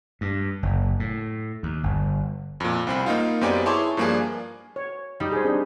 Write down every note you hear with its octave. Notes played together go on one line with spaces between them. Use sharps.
G2
F#1
A2
D#2
G1
F2 A#2
C2 C4 B5
A#3 D#4 F4
F#2 B3 C4 G4 D5 G#5
E4 G#4 C#5 A5 C6 D6
G2 F3 A#3 D4 G#4
C#5
G3 D#4 G4
G#4 C5
C4 D4